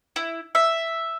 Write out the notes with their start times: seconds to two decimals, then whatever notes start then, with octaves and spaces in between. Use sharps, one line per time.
0.16 E4
0.55 E5